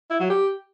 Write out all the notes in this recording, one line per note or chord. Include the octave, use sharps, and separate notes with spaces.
E4
F#3
G4